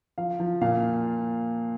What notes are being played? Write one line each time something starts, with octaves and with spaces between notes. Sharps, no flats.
F3 F5
F3
A#2 F5